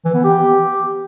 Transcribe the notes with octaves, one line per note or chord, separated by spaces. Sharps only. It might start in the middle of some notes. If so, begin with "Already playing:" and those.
E3
B3
G4